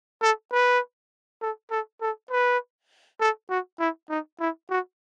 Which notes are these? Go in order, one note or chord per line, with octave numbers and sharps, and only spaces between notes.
A4
B4
A4
A4
A4
B4
A4
F#4
E4
D#4
E4
F#4